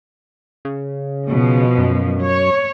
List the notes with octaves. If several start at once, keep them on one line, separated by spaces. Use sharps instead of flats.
C#3
B2 F3
F#2
C#5